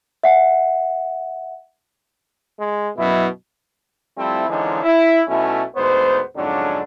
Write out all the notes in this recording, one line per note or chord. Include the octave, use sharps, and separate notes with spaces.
E5 F#5
G#3
F#2 B2 E4
F3 G3 A3 C4 E4
D3 E3 F3 G#3 C#4 D#4
E4
B1 B2 A3 C#4 E4
D2 G#2 B3 C5
F2 G#2 D3 F#3 C#4 D4